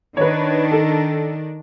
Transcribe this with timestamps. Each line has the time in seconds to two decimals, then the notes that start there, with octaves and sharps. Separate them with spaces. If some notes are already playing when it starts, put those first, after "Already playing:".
0.17 D#3 D4 B4 C#5
0.72 A4